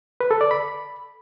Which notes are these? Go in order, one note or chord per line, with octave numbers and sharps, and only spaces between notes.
B4
A4
D5
B5